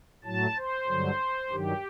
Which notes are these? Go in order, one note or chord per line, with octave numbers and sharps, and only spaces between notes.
A2 F#3 A5
C5
G2 D3 F#3
G2 D#3 F#3 G4